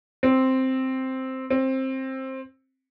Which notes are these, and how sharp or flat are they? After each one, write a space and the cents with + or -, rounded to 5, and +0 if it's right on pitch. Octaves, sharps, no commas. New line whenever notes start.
C4 +0
C4 +15